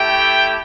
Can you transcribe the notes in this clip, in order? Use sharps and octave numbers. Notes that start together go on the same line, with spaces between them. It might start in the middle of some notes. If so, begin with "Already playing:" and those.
Already playing: A3 E4 G4 G5